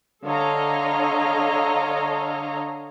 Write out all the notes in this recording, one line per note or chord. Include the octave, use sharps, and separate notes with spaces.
D3 A4 C#5 D#5 F5 A#5